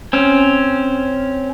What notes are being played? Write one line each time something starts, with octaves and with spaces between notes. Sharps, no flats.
C4 C#4